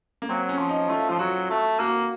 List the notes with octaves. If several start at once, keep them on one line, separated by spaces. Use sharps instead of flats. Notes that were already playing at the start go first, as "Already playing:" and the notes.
A#3
F#3 C4
C#4
F3
D#4
A3 F4
F3 F4
F#3 F#4
A3
A#3 F#4